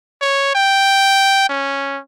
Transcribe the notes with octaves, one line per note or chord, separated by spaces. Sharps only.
C#5
G5
C#4